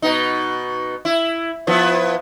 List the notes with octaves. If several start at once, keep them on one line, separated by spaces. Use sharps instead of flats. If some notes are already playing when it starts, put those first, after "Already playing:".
B2 B3 D#4
E4
F3 B3 E4